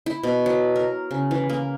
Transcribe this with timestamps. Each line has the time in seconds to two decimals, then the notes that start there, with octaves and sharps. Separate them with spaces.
0.06 E4
0.23 B2
0.46 F#3
0.76 A#4
1.11 C#3
1.31 E3
1.50 A#3